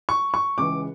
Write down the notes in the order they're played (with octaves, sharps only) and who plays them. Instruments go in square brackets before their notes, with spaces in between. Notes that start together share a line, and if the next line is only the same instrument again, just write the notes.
[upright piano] C#6
C#6
C#2 C#3 E3 D6